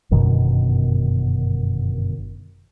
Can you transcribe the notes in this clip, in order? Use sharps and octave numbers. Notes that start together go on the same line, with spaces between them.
G1 F#2 B2 D#3